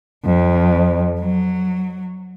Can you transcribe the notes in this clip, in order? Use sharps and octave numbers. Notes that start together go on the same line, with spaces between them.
F2
F#3